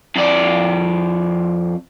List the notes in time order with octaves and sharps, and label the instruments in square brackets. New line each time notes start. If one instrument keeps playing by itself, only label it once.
[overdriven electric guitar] F2 D5